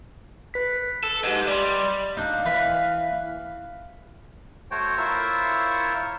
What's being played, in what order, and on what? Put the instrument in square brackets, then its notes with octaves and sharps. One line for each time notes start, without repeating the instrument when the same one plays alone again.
[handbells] B4 B6
[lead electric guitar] A4
[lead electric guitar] G#2 [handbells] G4 D#5
[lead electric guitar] G3 [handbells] D5 C6
[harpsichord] D4 D#4 [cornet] F5
[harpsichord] E3 B4 B5
[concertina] A3 F#4 C5 C#5 G5
E4 F4 A#4 C5 C#5 E5